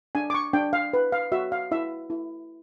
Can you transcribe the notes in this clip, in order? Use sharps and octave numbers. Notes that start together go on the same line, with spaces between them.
D4 G#5
D6
C#6
D4 G5
F5
B4
F5
F#4 E5
F5
E4 E5
E4